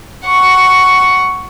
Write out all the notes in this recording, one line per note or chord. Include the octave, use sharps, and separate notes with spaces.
F#5 C#6